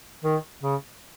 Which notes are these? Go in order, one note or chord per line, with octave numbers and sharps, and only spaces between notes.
D#3
C#3